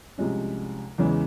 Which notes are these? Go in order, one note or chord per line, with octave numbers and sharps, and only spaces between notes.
C2 C3 F3 G#3 C#4
E2 C#3 E3 G#3